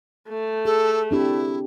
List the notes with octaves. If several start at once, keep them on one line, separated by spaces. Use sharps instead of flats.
A3
G#4 A4
C4 D4 E4 G4